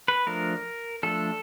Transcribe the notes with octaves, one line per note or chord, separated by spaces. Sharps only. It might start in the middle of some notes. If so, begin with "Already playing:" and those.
B4
F3 A3 D4 A#4
F3 A3 D4 A4